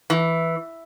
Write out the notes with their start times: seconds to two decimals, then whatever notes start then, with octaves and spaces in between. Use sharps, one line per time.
0.10 E3